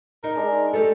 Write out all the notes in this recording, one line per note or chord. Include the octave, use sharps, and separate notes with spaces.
D#4 A#4
G#3 D4
G3 A3 A4 B4